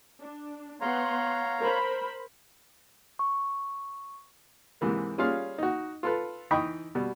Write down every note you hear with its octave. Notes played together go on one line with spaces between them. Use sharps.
D4
B3 C#5 F5 F#5 A#5 C6
A#4 C5 B5
C#6
G#2 C3 E3 A#3
G3 C#4 F4 G#4 F5
D#4 F#4
F4 A4 B4
E3 D#4 D#5 G5 B5 C#6
B2 G3